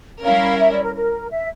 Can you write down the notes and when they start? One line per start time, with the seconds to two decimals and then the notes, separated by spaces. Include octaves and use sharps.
0.24 G3 C#4 E4 A#4 F5
0.59 E5
0.72 D5
0.83 A#4
0.95 A#4
1.31 E5